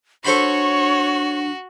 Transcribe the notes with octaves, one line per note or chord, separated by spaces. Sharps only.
D4 F#4 A4 C5 C#5 B5